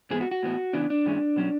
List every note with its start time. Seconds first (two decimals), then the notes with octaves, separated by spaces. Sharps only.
0.11 G#2 E3 G#3 B3 G#4
0.21 F#4
0.31 F#4
0.43 A2 E3 B3
0.73 C#3 E3 B3 D4
0.90 D4
1.05 G#2 E3 G#3 C#4
1.36 B2 F#3 C#4